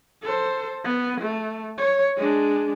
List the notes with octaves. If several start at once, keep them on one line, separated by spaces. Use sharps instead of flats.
A4 C5
B3
A3
C#5
G#3 D4